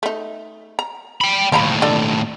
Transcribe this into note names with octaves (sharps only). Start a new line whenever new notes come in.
A3 D#4
A#5
G5 B5
D#2 A2 F3 A#5 B5
D4 F4 A4